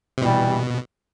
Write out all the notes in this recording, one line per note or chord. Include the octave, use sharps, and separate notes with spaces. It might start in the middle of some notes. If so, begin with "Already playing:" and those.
C3
B2 E3 G3